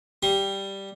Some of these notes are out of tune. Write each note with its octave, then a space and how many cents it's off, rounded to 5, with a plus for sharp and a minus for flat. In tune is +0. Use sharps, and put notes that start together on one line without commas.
G3 +0 C6 +40